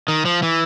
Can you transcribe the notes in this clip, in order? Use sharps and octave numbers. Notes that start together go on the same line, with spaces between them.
D#3
F3
E3